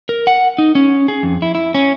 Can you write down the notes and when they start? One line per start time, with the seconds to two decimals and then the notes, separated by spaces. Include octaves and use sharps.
0.09 A#4
0.27 F#5
0.58 D#4
0.75 C#4
1.08 G#4
1.23 F2
1.42 E4
1.55 E4
1.75 C#4